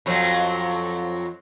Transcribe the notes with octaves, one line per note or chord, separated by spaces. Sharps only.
F2 F#3 C4